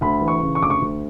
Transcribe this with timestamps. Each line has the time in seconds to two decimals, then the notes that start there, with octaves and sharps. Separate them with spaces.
0.01 D2 B5
0.21 E3
0.28 C#6
0.42 C#3
0.55 C#6
0.62 D2 D6
0.70 C#6
0.82 D2